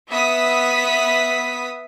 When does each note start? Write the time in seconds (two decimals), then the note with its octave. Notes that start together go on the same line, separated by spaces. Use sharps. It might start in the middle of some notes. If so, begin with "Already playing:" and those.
0.10 B3 E5 D#6 B6